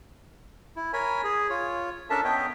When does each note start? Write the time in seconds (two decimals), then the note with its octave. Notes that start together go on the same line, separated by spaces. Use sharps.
0.76 E4
0.93 A#4 C#5 G#5 B5
1.24 G#4
1.50 F4 C#5
2.10 C#4 D4 A4 A#4 E5 A5
2.24 B3 C#5 D#5 E5 G5